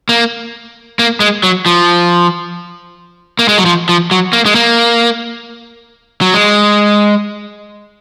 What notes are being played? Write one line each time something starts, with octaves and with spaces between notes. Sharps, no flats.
A#3
A#3
G#3
F#3
F3
A#3
G#3
F#3
F3
F3
F#3
A#3
G#3
A#3
F#3
G#3